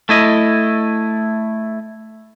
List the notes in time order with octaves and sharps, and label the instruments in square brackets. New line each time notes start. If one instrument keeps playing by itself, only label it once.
[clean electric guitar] A3 E4 D#5